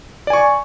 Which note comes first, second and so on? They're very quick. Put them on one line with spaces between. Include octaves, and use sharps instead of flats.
D5 G#5 C#6